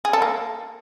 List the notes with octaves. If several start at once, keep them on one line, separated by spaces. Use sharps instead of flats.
G#4
A4
A#3